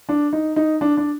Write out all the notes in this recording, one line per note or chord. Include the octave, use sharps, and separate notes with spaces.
D4
D#4
D#4
D4
D4